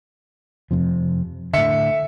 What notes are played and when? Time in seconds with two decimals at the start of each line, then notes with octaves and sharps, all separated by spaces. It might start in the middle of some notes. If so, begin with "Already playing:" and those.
0.71 F2 C3 F3
1.53 A2 D3 E5 C#7